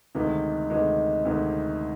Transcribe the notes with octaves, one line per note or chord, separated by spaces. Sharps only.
D2 C3 D#3 G#3
D2 C3 D#3 G#3
D2 C3 D#3 G#3